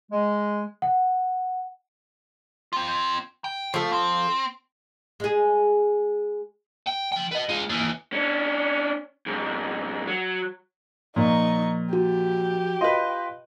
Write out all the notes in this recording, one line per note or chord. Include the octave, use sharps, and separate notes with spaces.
G#3
F#5
C4 F4
G5
F3 A3 A4
C4
G#3 G#4
G5
F3 G5
B4 D#5
G#3 F4
D#2 E3
C#4 D4
F2 G#2
F#3
A#2 F3 D#4 C#6
F#4 G4
F4 B4 D#5 F5 C6